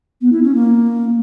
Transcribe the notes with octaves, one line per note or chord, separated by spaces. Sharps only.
B3
E4
C#4
A#3